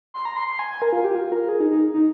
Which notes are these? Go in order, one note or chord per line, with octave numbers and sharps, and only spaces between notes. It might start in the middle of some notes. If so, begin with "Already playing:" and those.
C6
A#5
C6
C6
G#5
G#5
A#4
F4
G4
F4
A#4
G#4
D#4
D#4
D#4